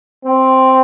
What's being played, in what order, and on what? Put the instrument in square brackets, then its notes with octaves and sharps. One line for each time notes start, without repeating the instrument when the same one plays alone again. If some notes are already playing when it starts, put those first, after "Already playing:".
[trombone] C4